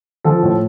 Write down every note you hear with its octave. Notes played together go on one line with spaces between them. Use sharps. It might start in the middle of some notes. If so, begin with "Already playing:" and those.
F3 A4
A2